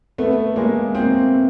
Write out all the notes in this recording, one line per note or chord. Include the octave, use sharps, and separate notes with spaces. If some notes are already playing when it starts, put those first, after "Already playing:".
A3 B3
G#3 A#3
A#3 C4